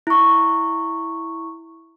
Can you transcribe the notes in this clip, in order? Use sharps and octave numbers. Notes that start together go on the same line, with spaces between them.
E4 C#6